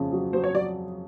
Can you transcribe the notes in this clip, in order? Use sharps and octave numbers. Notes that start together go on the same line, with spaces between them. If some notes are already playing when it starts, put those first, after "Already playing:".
Already playing: F2 C#3
F#3
F#3 C5
C#5
F#3 D5